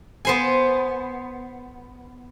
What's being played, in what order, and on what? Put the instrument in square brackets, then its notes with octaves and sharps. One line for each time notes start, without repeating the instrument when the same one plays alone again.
[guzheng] B3 C5 G#5